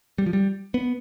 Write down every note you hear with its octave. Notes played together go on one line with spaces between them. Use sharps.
G3
F3
G3
B3